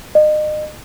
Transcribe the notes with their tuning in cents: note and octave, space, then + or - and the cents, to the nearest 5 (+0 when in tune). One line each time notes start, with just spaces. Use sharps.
D#5 -35